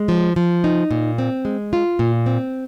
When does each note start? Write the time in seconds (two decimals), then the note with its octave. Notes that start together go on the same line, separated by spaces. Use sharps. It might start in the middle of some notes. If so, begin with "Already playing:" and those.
Already playing: G#3
0.08 F3
0.36 F3
0.64 D#4
0.91 A#2
1.18 C4
1.45 G#3
1.73 F4
1.99 A#2
2.26 C4